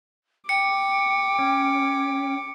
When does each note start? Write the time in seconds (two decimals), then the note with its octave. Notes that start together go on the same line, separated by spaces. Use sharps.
0.49 G5 D6 C#7
1.39 C#4